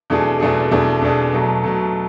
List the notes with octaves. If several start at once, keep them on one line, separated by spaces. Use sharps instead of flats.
E2 B2 A3 D4 G#4
E2 B2 A3 D4 G#4
E2 B2 A3 D4 G#4
E2 B2 A3 D4 G#4
B2 F#3 A3
B2 F#3 A3